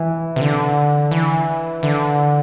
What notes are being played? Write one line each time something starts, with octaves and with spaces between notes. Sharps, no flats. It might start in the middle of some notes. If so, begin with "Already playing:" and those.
Already playing: E3
C3
D3
E3
D3